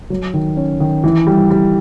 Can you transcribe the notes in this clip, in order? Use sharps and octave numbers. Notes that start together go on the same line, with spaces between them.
F#3
D#3
C#4
D#3
E3
G3
G3